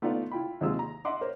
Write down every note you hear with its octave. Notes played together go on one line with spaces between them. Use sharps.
A3 B3 D#4 F4 D5 F5
E4 F4 G5 B5
D#2 C3 F#3 G#3 F4 E6
A#5
D#5 E5 F#5 C6 D6
A#4 C5 C#5